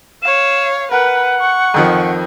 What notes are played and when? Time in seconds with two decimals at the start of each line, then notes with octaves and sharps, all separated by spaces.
0.23 C#5 F5 E7
0.91 A#4 B4 F#5
1.39 C#6
1.74 F2 D#3 F3